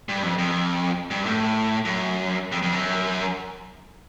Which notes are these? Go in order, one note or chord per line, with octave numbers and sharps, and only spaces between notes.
G2
F2
F2
G2
A2
F#2
F2
F2
F#2